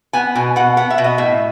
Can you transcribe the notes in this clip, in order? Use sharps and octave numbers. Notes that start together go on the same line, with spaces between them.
B3 G#5
B2 G#5
B2 F#5
B3 F#5
E5
B2
D#5
A2 E5